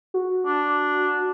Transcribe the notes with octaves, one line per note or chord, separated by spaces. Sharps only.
F#4
D4